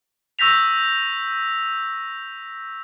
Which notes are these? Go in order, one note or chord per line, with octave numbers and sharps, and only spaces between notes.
C#6 E6 G6 A#6 B6 F7